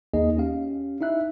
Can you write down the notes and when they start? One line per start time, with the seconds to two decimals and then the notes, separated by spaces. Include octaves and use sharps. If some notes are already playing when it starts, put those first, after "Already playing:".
0.14 D#2 A#3 D#4 G#4 D#5
0.37 C#4 G4 F5
1.01 D#4 E4 E5 F#6